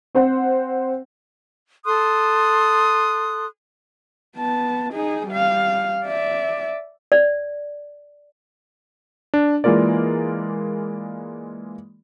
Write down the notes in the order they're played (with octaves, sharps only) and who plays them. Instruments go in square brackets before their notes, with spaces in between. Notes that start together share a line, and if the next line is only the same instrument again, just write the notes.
[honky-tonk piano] C4 C5 F#5
[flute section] A4 C6 D#6 F#6
[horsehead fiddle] B3 A5
D#4 G#4
G3 F5
D5 E5
[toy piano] D5
[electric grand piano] D4
E3 G#3 A#3 F4 A#4 D5